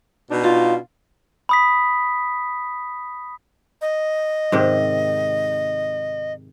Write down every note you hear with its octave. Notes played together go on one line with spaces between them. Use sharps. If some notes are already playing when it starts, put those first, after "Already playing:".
B2 D4 D#4
F4
B5 D#6 B6
D#5
G#2 C3 D#3